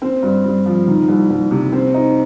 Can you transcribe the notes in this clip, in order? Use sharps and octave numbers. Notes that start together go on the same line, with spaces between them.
C4
G2
G2
F3
D#3
C2
C2
C3
C4
D#4